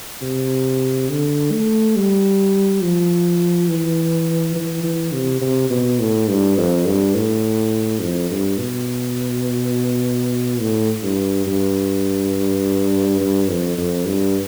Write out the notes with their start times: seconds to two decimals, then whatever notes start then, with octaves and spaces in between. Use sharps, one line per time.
0.22 C3
1.09 D3
1.51 A3
1.96 G3
2.82 F3
3.68 E3
4.55 E3
4.83 E3
5.12 C3
5.41 C3
5.70 B2
5.99 A2
6.28 G2
6.57 F2
6.86 G2
7.14 A2
8.01 F2
8.30 G2
8.58 B2
10.60 A2
11.03 G2
11.46 G2
13.20 G2
13.48 F2
13.77 F2
14.06 G2